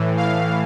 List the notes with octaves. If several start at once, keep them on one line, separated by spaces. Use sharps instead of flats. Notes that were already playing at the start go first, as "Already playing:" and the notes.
Already playing: A2 E3
F5